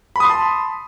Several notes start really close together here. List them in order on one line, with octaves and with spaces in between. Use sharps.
B5 D#6 C6 A5